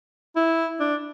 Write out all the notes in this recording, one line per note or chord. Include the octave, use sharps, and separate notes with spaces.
E4
D4